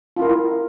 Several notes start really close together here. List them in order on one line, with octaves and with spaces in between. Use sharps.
F4 E4 A#4